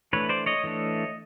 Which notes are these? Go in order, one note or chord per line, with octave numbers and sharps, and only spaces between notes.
E3 A3 D4 B4 C#5
C5 D5
C#5 D#5
E3 A3 D4